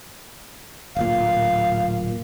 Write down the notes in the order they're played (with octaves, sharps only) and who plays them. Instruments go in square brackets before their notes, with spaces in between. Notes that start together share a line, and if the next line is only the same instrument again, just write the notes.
[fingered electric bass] D1 A#2 [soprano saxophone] F5